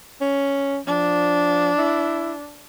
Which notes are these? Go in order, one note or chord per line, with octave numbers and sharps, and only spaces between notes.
C#4
F3 D4
E4